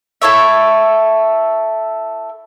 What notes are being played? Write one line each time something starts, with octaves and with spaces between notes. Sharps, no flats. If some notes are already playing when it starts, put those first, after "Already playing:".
E4 A4 C#5 E5